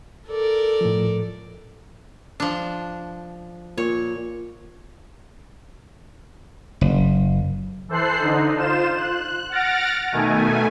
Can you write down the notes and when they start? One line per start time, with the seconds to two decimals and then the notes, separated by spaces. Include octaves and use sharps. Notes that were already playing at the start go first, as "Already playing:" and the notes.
0.27 A4 A#4 D5
0.81 A2 F3
2.40 F3 D4
3.78 A#2 C#5
6.81 F#1
7.89 E3 A4 C5 F#6 C7
8.20 D3 D#4
8.57 F4 C5 E7
8.96 F#6
9.50 F#5 F6 A6 A#6 D7
10.12 B2 D#3 A3 G#5